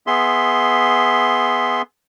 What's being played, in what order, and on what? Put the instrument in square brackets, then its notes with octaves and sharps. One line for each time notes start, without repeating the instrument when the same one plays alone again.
[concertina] B3 G#4 E5 C6